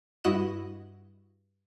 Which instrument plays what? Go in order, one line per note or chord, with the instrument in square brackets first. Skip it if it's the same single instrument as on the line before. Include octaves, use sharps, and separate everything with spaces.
[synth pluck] G2 E4 F#4 D#5 F#6 E7